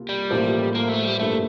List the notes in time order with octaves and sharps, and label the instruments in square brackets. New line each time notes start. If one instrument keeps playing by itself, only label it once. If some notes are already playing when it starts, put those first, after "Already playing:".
Already playing: [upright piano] C2 A#3 F4
[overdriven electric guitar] G3
[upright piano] A1 A2 F3 A#3
[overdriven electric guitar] A#3
A3
G3
[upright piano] G2 F3 A#3 E4 A4 [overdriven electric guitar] A3